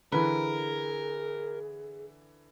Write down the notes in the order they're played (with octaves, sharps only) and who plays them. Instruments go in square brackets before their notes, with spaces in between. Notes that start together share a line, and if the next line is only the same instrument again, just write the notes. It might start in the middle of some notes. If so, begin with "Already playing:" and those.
[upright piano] D3 E3 [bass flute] G#4 [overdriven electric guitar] A#4 [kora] B4